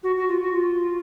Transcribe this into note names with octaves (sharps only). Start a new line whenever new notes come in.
F#4
F#4
F4
F#4
F4